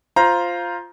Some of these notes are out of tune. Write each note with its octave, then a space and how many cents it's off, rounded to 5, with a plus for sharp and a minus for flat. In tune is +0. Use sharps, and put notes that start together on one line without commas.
F4 +0 C5 +0 A#5 +15